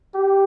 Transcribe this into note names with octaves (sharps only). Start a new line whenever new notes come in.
G4